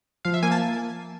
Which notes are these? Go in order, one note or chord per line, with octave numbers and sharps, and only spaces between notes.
F3 F5
E5
A#3 G#5
A5